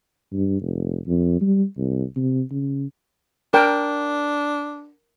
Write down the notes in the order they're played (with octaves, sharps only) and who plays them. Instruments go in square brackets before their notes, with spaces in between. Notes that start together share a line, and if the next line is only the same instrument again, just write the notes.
[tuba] G2
F1
F2
G3
C2
C3
C#3
[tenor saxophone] D4 [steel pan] A#4 G5